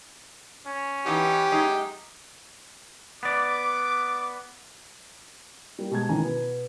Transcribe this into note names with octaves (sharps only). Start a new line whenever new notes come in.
C#4
E3 B3 D#4 G4
F#2 G#3 D#4
B3 D5 D6
F#3 G3 A#3
B2 G#3 A5 G#6
A1 D#3 G#5 A#5
B2 B3